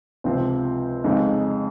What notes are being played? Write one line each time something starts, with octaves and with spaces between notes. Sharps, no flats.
C#2 C3 F3 C4 F4
F2 C#3 G#3 D#4